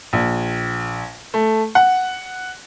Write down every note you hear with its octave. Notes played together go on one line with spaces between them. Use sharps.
A#1
A3
F#5